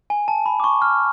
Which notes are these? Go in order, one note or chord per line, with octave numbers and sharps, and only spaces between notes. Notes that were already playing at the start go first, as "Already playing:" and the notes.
G#5
A5
B5
D6
C#6
F6